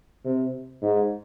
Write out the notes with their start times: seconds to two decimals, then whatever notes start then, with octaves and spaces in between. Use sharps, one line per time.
0.25 C3
0.82 G#2